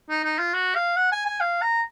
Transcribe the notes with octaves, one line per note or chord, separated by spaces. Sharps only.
D#4
D#4
F4
F#4
F5
F#5
G#5
G#5
F5
A#5